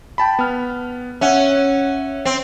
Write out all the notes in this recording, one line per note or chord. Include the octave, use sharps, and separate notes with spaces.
G5 A5 B5
B3 F6
C#4 E5 F#5
C4